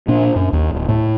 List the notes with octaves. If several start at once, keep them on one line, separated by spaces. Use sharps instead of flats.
A#2 D4
F#2
D#2
D1
A2